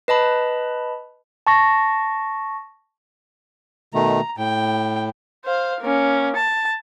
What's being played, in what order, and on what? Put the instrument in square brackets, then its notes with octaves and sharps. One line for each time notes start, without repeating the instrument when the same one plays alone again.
[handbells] B4 D#5 A5 B5
A5 C#6 A#6
[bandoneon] B2 D#3 A3 [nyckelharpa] A#5
[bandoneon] A2 [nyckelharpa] G5
[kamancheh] C5 F5
A#3 C#4
A5